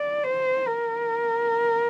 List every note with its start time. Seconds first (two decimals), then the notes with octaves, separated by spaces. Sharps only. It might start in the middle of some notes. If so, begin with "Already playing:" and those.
Already playing: D5
0.24 C5
0.68 A#4